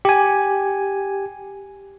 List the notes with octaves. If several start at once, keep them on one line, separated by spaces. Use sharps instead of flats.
G4 G#5